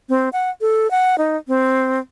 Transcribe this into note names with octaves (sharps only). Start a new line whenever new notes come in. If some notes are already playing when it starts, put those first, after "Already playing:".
C4
F#5
A4
F#5
D#4
C4